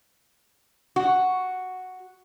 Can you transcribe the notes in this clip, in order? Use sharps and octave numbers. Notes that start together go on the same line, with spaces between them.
F#4